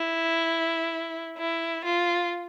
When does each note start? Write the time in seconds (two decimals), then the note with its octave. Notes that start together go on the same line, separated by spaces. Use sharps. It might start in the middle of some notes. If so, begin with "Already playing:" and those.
Already playing: E4
1.37 E4
1.84 F4